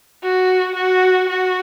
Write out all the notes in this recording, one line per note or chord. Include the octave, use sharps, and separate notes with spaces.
F#4
F#4
F#4